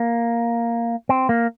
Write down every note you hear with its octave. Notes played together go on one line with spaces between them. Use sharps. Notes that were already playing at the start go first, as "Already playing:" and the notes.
Already playing: A#3
C4
A#3